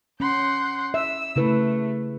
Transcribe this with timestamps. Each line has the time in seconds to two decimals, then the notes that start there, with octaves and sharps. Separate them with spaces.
0.20 C#4 F#5 C6 G6
0.94 E5 E6
1.36 C#3 A3 E4 B4